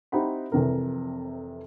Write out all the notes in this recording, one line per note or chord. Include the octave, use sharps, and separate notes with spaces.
C4 D#4 E4 G4 F#5 B5
F1 F2 C3 E3 A#4